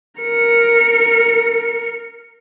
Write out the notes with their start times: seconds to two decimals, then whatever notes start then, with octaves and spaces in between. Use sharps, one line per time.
0.21 A#4 C#7